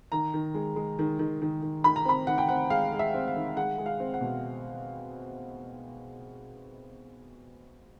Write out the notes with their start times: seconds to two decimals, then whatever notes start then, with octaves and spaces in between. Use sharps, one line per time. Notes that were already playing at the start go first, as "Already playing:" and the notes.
0.12 D#3 A#5
0.34 D#3
0.54 G#3
0.76 G#3
0.99 D#3
1.19 D#3
1.42 D#3
1.62 D#3
1.84 D#3 B5
1.96 A#5
2.05 C4 B5
2.27 D#3 F#5
2.38 G5
2.48 C4 F#5
2.70 G#3 F5
2.92 G#3
2.99 E5
3.14 C4
3.28 F5
3.36 D#3
3.56 G#3 F#5
3.78 G#3
3.86 F5
4.00 C4
4.14 F#5
4.21 B2